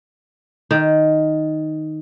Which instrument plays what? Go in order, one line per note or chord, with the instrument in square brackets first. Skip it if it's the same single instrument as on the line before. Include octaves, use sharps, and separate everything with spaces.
[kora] D#3